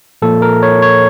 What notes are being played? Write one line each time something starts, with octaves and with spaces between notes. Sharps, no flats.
A#2 F3 A#3 A4
A#4
C#5
C#5